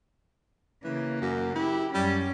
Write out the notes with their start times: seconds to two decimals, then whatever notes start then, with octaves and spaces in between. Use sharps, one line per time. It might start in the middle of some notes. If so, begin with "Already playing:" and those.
0.84 C#3 E3 A#3
1.21 F#2
1.55 E4 G4
1.94 F#2 G3 C#4